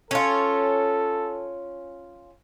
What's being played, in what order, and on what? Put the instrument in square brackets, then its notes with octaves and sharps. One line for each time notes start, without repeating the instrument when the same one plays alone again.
[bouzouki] C#4 F4 [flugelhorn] A4